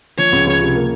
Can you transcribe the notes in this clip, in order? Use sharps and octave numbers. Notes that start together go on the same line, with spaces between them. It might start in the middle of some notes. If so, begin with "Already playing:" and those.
F3 C#5
C#2
C#2
C3
A#3